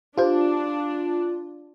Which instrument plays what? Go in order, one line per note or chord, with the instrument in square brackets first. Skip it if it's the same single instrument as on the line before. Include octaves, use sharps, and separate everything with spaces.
[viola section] D4 [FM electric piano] F4 [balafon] G4 C5